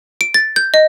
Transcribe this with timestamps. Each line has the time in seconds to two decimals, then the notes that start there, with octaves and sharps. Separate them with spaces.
0.21 D7
0.34 A6
0.56 G6
0.74 D#5